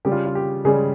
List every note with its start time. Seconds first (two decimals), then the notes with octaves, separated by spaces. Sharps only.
0.05 C#3 G3 G4
0.12 F4
0.26 F4
0.35 G4
0.65 C#3 G3 G#3 G#4